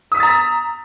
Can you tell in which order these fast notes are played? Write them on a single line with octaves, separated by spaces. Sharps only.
D#6 B6 E6 A6 A#5